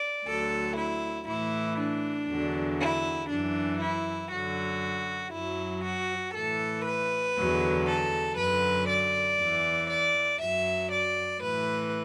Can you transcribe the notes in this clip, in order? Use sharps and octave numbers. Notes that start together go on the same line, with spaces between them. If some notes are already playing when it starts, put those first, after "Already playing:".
Already playing: D5
D2 D3 F#3 A4
E4
A2 E3 E4
D4
E2 D3 F#3
E4
F#2 E3 D4
E4
F#2 D3 F#3 F#4
F#2 F#3 E4
F#4
A2 E3 A4
B4
E2 D3 F#3
A4
F#2 D3 F#3 B4
D5
E2 E3
D5
F#2 F#3 E5
D5
A2 E3 B4